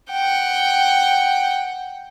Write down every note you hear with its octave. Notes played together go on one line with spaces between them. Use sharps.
F#5 G5